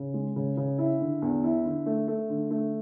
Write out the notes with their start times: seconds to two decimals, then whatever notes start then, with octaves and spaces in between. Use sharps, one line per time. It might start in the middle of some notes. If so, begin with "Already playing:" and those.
Already playing: C#3
0.14 G#3
0.36 C#3
0.57 C#3
0.78 E4
1.01 D3
1.22 E2
1.43 E4
1.65 D3
1.86 A3
2.08 A3
2.30 D3
2.51 A3